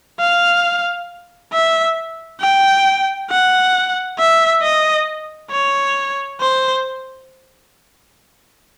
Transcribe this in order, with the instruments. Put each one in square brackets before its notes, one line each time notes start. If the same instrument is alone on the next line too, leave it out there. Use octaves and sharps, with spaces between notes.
[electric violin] F5
E5
G5
F#5
E5
D#5
C#5
C5